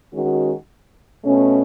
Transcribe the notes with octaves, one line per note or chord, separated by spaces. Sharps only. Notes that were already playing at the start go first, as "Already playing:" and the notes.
D#3 G#3 C#4 F#4
B2 A3 C#4